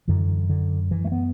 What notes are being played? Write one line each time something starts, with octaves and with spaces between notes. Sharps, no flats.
F#2 D3 E3
D3
E3
A3
B3